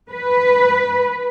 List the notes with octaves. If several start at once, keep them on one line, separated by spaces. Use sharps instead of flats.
B4